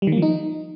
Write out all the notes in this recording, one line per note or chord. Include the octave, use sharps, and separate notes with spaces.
G3
D#3
A#3
F3
D#4